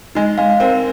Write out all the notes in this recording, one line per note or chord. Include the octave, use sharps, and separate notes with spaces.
G#3 D#4
G#3 F5
C4 A#4